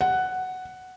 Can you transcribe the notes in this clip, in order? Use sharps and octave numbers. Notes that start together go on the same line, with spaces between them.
F#5